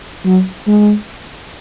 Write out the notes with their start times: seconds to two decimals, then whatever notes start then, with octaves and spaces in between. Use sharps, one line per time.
0.26 F#3
0.67 G#3